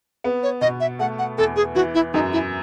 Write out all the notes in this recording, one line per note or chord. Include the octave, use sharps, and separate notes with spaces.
B3
C#5
B2 D#5
E5
A3 F#5
F#5
E2 A4
G#4
E3 F#4
E4
F#2 D#4
E4